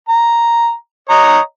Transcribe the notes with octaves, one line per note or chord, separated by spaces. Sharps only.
A#5
C#5 D#5 A#5